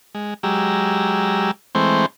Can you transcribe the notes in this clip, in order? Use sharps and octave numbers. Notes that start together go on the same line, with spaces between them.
G#3
F#3 G#3 G4 A#5 E6
E3 G#3 A3 C4 C5 C#6